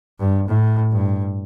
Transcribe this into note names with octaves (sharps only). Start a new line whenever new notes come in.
G2
A2
G2